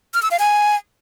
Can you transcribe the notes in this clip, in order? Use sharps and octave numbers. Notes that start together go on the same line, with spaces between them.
F6
E6
F5
G#5